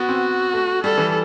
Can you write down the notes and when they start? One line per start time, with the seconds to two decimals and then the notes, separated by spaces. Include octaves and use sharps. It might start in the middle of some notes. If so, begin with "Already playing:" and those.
Already playing: B3 F#4
0.09 C4
0.53 A3
0.83 G3 A4
0.98 E3